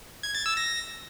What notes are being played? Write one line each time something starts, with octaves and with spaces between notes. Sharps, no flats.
G#6
A6
E6
A#6